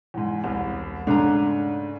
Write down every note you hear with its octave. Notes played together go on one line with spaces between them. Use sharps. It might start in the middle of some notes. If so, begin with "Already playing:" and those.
E2 G#2
E1 C2
G#2 C#3 A3 D4 A#5